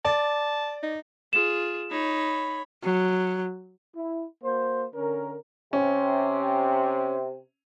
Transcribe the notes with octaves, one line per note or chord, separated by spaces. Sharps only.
D5 A5
D#4
F4 G#4 E7
D#4 C#5 B5
F#3
E4
A#3 F#4 C5
D3 C#4 A#4
C3 C#4